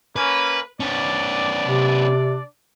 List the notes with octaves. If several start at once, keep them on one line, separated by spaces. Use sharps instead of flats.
A#3 C#4 B4
B3 C#4 D4 D5
C3